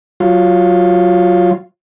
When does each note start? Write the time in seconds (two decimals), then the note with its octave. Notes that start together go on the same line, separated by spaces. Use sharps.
0.20 F#3 F4